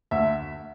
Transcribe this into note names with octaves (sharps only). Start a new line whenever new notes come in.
D2 E5